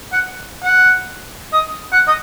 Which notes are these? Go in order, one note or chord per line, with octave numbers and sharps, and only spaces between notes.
F#5
F#5
D#5
F#5
D#5